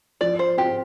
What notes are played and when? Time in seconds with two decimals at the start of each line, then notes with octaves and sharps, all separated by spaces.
0.21 F3 D5
0.39 C5
0.58 C4 F4 G4 C5